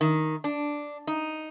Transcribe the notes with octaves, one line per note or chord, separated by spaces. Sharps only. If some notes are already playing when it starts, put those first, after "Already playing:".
D#3
D4
D#4